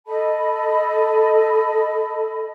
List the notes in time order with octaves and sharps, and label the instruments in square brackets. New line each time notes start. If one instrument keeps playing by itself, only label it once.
[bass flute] A4 [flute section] D#5 A5 B5